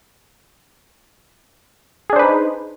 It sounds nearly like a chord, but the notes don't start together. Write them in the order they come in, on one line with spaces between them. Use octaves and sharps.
G#4 D4 C5 B4 D#4